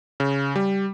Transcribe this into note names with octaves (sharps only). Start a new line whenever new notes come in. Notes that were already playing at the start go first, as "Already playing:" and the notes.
C#3
G3